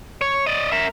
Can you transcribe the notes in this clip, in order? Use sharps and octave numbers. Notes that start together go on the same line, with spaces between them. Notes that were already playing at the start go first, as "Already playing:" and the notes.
C#5
D5 D#5
A#4 E5